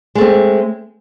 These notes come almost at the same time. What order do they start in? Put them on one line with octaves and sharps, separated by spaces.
G#3 A3 C4